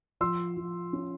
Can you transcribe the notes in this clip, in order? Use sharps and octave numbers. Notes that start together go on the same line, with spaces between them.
F3 C6 E6
F3
C#4